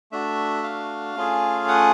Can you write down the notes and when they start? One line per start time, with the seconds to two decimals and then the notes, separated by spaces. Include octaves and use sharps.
0.12 A3 D4 F#4 E5
0.63 F5
1.16 A3 C#4 F4 G#4
1.68 F#5